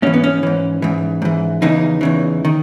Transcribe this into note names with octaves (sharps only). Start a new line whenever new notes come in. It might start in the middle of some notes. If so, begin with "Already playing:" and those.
G#2 E3 C#4
B3
C#4
G#2 E3
G#2 E3
G#2 E3
E2 C#3 E3 D#4
E2 C#3 E3
D#3